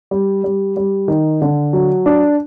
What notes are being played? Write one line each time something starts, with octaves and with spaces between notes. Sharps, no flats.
G3
G3
G3
D#3
D3
F#3
D4